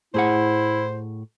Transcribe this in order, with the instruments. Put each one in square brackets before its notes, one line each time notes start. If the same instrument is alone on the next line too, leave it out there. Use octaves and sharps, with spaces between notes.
[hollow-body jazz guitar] A2 G#4 F#5 [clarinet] E4 [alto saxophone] C5